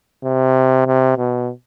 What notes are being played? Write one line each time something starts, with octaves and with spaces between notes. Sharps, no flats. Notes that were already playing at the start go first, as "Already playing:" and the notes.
C3
C3
B2